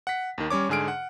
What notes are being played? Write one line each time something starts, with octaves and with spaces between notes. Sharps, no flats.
F#5 B6
D#2 D#3
G3 C#4 C#5 D6
G#2 D3 G#4 F6 D7
F#5